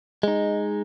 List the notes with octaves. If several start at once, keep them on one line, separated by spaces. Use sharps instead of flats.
G#3 D#4